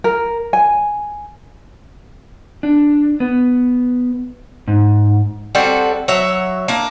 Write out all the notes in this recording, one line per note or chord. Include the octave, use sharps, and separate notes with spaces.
A#4
G#5
D4
B3
G#2
G3 C4 F#4 A4
F#3 C#5 E5
A#3 D4